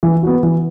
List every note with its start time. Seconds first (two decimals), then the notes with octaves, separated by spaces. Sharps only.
0.03 E3
0.23 B3 F#4
0.43 E3